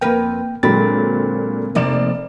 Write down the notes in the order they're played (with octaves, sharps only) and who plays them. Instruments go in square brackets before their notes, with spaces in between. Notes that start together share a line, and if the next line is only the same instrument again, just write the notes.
[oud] F2 A#4 B4 [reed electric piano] A#3 G5
[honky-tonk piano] A#2 D3 F#3 [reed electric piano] G#3 B5 A6 [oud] C4
[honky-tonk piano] F1 D5 E7 [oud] C3 A#3 D#4